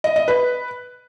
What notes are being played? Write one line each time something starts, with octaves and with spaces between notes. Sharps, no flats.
D#5
D#5
B4